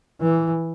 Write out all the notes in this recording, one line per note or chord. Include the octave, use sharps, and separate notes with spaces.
E3